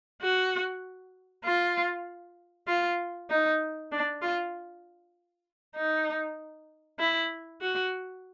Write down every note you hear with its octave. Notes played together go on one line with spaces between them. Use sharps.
F#4
F4
F4
D#4
D4
F4
D#4
E4
F#4